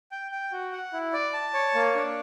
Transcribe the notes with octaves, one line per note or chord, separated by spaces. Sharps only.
G5
G5
F#4
F#5
E4
D5
A5
C#5
A#3
D4